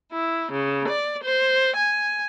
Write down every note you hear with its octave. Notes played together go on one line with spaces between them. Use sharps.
E4
C#3
D5
C5
G#5